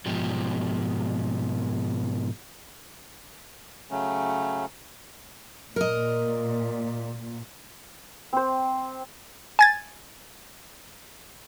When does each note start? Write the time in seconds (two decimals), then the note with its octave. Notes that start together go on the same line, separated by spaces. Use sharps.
0.06 G#2 B2 F3 G4
3.91 C#3 F#3 A3 C#4
5.76 A#2 A#4 D#5
8.33 C4 C5
9.59 G#5 G#6 A6